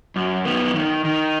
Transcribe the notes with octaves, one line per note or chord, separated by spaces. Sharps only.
F#2
D#3 B3
D#3
D#3